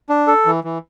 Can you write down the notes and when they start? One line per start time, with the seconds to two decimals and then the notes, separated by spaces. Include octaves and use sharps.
0.09 D4
0.27 A4
0.46 E3
0.64 E3